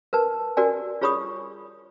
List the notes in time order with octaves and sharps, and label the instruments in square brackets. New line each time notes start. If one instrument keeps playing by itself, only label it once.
[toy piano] A#4 B4 A5
F#4 A#4 D5 G#5
F4 G#4 C#5 B5 C#6 D#6